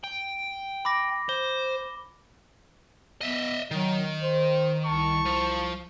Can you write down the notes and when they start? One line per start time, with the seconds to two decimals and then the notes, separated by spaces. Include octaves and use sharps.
0.04 G5
0.85 B5 D6 A#6
1.29 C5 G7
3.21 B3 D#5 E5
3.71 D#3 F#3
4.22 C5
4.84 C2 A5 C#6
5.26 F3